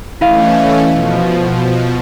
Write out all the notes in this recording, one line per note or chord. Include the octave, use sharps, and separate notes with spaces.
E3 A3 C#4 E4 D#5 F5
B2 F3